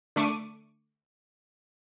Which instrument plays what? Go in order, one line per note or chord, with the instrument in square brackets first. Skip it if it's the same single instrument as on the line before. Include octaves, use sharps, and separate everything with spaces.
[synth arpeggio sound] D3 A3 C#6 D6 D#7